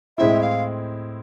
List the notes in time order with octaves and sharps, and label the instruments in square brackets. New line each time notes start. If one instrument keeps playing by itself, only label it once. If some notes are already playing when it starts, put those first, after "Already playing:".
[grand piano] A2 G#3 C4 E4 [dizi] E5
[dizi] F5